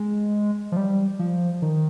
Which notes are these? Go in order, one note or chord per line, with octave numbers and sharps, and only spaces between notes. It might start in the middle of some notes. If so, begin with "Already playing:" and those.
Already playing: G#3
F3
G3
F3
D#3